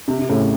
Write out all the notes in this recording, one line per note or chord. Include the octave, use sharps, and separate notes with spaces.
C3
C3
A2 C#3